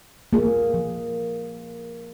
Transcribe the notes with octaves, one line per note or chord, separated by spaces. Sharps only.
A#3 F4 G#4
F3